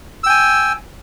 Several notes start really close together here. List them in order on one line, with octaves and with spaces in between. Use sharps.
E6 G5 G#5